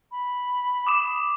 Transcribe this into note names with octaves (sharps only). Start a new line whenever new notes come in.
B5
D6 D#6 E7